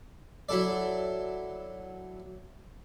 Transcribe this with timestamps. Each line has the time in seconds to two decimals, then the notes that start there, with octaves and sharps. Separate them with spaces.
0.49 F#3 E4 A4 D5